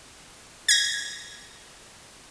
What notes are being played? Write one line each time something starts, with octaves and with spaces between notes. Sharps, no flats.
G#6 A#6